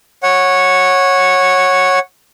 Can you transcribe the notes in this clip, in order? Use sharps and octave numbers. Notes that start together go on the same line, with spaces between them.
C#5 F#5